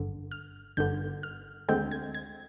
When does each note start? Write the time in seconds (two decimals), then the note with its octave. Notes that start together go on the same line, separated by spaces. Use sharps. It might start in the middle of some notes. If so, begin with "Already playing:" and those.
Already playing: G1 G2 D3
0.31 F6
0.77 G1 G2 D3 G6
1.23 F6
1.69 D2 D3 G#3 C4 G6
1.91 G#6
2.14 G#6